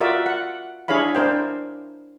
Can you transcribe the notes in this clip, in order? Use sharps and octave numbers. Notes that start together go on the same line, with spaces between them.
F4 F#4 A#4 D5 E5
F#5
D4 E4 G#4 C#5 F5 B5
D4 A#4 C5 G5